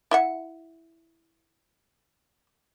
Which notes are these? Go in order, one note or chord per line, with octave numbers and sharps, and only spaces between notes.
E4 E5 F#5